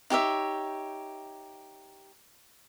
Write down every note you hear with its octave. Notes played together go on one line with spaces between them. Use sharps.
D#4 G4 C#5 E5